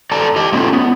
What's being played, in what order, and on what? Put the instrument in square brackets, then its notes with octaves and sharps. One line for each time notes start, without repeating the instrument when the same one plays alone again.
[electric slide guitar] A4 D5 A5 A#5
G4 D#5
A3 B3 C#4 E4 F4
B3